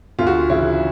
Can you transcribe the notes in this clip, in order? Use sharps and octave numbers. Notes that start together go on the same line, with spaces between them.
D2 F4
F#4
F4
C#3 E3 E4